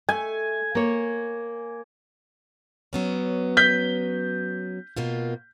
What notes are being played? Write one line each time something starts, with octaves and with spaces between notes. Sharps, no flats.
A3 G#5
A#3 C#5
F#3 B3 C#4
G6 B6 G7
B2 A#3 F4